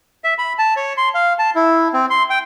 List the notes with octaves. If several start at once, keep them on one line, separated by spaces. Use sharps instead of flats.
E5
B5
A5
C#5
C6
F5
A5
E4
C4
C6
G5